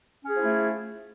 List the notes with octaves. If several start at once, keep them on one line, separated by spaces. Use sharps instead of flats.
F3 A3 C#4 E4 G#4